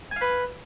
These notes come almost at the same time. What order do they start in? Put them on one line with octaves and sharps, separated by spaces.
G#5 F5 B4